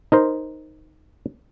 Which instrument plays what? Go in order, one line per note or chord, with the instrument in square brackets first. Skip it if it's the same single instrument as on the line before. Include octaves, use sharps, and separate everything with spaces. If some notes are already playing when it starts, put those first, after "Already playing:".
[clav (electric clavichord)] D#4 A#4 C5